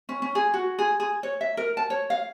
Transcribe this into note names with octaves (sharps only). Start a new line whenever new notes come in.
C#4
C#4
G#4
F#4
G#4
G#4
C#5
E5
A#4
A5
C#5
F5